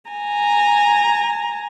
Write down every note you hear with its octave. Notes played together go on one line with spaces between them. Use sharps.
G#5 A#5